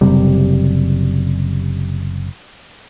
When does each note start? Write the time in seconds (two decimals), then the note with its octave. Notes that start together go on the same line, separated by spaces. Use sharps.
0.01 F#1 C3 G3